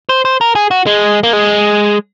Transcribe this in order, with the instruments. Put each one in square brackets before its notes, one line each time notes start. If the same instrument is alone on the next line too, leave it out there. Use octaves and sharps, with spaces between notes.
[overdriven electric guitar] C5
C5
A#4
G#4
F#4
G#3
A#3
G#3